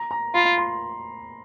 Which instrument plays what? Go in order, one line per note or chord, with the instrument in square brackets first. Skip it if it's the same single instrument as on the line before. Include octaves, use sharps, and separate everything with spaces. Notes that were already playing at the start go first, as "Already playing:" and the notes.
Already playing: [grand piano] A#5
A#5
[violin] F4 [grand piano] B5
[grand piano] C6